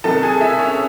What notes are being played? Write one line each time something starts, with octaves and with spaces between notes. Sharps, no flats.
C2 C3 D#3 F#3 A4 A5
G#4 G#5
E4 E5
C#4 C#5